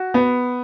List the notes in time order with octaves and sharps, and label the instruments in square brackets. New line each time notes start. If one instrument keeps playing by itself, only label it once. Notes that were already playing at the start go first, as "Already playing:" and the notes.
Already playing: [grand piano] F#4
B3